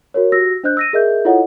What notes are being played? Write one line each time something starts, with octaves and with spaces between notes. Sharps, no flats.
F#4 A#4 C#5
F#4 G4 E6 A#6
D4 C5 D#5 F#6 G6
E6 A#6 D#7
G#4 A#4 D#5 E5 G6
E4 F4 A4 C#5 D#5 F#5